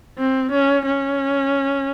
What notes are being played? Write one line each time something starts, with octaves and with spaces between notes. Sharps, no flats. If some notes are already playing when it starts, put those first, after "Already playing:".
C4
C#4
C#4